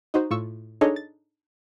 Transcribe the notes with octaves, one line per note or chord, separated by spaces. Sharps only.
D#4 F#4 C5
A2 F4 C#6 E6
D4 D#4 G#4 A4 C#5 D#5
A6